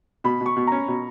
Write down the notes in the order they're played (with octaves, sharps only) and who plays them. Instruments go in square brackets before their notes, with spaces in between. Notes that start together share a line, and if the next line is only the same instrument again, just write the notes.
[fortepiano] B2 [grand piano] B5
[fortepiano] B2
[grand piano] C#6
[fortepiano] B2
[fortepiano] C#4 [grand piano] A#5
[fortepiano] B2